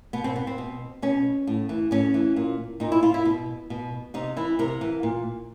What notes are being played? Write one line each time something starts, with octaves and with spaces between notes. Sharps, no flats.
B2 B3
C4
B3
C4
B2
B2 C#4
A2
E3
A2 C#4
E3
A#2
A#2 D#4
E4
F4
E4
B2
B2
C3 D#4
E3 E4
C3 A#4
E3
A#2